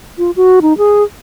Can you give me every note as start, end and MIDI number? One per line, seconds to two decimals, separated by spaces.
0.18 0.31 65
0.36 0.60 66
0.62 0.77 63
0.78 1.03 68